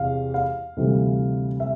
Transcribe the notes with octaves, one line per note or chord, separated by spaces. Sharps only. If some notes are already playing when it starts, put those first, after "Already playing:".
Already playing: E2 C3 F5
F5
D2 C3 E3 G3
E5